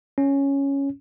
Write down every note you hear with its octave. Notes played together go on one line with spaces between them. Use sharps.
C#4